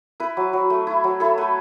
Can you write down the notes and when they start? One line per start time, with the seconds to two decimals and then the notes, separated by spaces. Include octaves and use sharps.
0.20 E4 B4
0.37 F#3
0.53 F#3
0.70 A3
0.87 E4
1.04 F#3
1.20 E4 A4
1.38 A3 B4